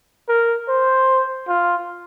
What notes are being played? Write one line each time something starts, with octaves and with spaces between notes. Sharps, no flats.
A#4
C5
F4